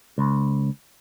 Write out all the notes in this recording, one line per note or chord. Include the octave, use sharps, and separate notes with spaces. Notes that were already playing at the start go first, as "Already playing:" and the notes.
C#2